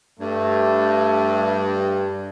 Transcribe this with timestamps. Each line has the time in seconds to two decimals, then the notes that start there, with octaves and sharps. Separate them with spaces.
0.19 G2 A3